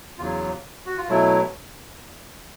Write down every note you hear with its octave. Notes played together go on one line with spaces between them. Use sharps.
E2 C#3 F#3 F4
F#4
F4
B2 F#3 A3 E4